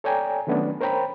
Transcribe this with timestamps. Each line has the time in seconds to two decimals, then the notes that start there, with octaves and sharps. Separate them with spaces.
0.04 A4 C#5 D5 G5 G#5 A#5
0.47 D#3 F#3 A3 B3 C#4 D4
0.81 A#4 C5 C#5 G5 A#5 B5